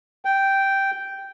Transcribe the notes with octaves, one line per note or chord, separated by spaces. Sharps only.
G5